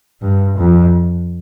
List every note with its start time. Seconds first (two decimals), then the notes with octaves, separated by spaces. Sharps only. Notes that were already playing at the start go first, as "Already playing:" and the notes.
0.21 G2
0.58 F2